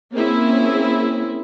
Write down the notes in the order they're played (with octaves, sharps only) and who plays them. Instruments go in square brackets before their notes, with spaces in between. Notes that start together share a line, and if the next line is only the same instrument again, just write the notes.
[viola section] A#3 C4 C#4 E4 G#4